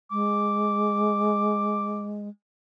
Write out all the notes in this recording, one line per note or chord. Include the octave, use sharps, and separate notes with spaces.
G#3 D6